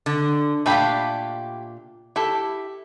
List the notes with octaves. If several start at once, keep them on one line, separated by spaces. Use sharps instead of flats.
D3
A#2 A3 D4 G4 F5 B5
E4 G4 A4